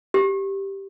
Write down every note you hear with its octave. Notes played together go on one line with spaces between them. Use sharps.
G4